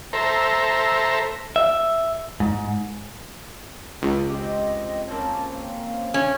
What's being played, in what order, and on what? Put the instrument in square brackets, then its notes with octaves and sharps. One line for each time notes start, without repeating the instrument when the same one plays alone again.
[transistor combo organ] A4 C5 E5 A#5
[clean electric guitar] E5
G#2
[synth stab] C#2
[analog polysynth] C4 G4 [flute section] D#5
[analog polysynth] A#3 C4 C#4 [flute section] A5
[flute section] F5
[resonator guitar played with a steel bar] C#4